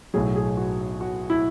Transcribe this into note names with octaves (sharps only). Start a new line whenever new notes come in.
B1 A2 F#3 G#4
G#4
F#4
F#4
E4